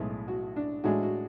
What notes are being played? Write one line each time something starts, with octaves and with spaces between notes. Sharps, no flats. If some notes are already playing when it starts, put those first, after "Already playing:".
Already playing: B1 A2 G#3 B3
F#4
D4
A2 G#3 D4 F#4
F#4